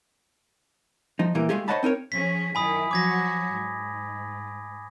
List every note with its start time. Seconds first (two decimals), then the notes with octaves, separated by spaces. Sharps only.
1.19 F3 D#4
1.35 A#2 E3 A#3 G4
1.49 G#3 A3 F4 G4 G#4
1.68 C5 C#5 D#5 F#5 A5 B5
1.83 C4 D#4 A#4 C#5
2.12 F3 C#4 G#4 B6
2.55 F#2 D#3 E4 G#5 B5 D#6
2.91 F3 F#3 F#4 D6 G#6 A#6
3.51 G#2